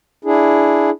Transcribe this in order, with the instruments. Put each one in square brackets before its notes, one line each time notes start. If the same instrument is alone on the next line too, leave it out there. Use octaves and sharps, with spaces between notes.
[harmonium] D4 E4 G#4